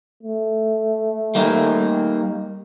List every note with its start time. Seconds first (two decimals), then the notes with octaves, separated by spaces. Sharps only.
0.23 A3
1.35 G3 A#3 D#4